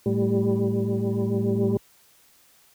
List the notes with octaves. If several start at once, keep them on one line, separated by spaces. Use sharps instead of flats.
A2 G3